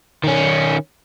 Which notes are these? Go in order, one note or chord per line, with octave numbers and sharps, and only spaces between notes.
D#3 C#4